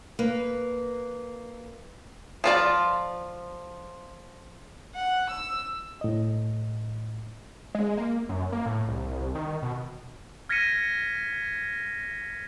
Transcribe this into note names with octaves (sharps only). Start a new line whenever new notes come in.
A#3 B4
F3 F4 D5
F#5
E6
A2 D#5
G#3
A#3
F#2
A#3
A2
C2
D#3
B2
F6 G#6 A#6 B6 C#7 D#7